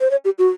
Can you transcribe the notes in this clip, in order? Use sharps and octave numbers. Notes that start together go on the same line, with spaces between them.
C5
C#5
G4
F#4